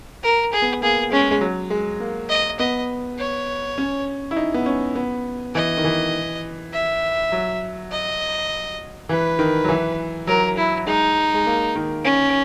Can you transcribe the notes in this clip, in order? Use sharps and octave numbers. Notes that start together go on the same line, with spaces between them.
A#4
G#4
B3
A#3 G#4
G#3 C#4
G#3
F#3
G#3
A#3
D#5
B3 D#5
C#5
C#4
E4
D#4
B3
C#4
B3
E3 D#5
D#3
E3
E5
F#3
D#5
E3 B4
D#3
F#3
E3
F#3 A#4
E4
G#3 D#4
G#3
A#3
D#3
C#4